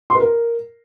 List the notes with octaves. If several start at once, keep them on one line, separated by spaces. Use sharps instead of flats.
C6
B4
A#4